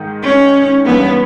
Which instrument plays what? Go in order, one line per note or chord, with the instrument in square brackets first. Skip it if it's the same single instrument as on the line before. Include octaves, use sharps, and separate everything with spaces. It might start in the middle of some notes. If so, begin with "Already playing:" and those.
Already playing: [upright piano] G#2 D#3 G#3 D#4
[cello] C#4
[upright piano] G2 E3 A#3 C#4 [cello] B3